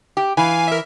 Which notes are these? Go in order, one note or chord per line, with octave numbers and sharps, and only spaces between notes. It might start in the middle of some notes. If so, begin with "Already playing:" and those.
G4
E3 F5 G#5
A#4 E5